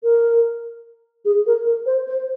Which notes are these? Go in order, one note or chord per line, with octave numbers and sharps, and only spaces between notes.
A#4
G#4
A#4
A#4
C5
C5